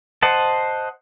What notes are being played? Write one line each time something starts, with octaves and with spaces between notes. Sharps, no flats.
C5 D#5 F#5 A5